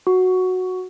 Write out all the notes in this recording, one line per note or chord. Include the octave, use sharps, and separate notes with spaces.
F#4